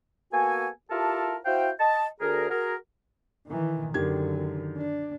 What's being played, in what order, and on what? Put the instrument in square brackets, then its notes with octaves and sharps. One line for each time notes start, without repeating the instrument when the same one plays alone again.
[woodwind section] A#3 B3 F#4 A4 G#5
E4 F4 G4 A4 A#4 A5
E4 F#4 C5 F5 G5
D#5 A5
D2 G#4 A#4
F#4 G#4 A#4
[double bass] D#3 E3
[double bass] F#2 D3 [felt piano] D#3 G4 G#6
[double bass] D4